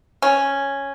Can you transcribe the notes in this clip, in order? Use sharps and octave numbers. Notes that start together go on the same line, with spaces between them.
C#4